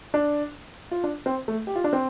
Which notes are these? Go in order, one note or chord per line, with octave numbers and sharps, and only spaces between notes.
D4
F4
D4
C4
A3
G4
F4
D4
C4